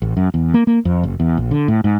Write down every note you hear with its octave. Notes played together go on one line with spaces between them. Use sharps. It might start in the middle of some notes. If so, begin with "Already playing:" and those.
A1
F#2
E2
A#3
A#3
F2
F#1
E2
A#1
D3
A2
G#2